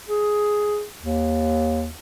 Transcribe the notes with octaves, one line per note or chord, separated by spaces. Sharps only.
G#4
D#2